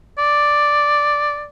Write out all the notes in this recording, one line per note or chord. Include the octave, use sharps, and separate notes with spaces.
D5